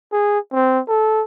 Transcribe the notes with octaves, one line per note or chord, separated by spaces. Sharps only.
G#4
C4
A4